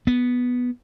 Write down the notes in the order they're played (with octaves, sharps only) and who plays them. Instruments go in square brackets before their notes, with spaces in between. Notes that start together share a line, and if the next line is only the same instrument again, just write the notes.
[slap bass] B3